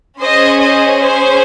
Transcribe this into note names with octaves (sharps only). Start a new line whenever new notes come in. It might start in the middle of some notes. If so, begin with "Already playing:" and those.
C#4 G#4 C5 D#5
C5 D#5
C5